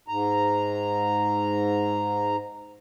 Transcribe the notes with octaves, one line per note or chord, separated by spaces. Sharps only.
G#2 A#5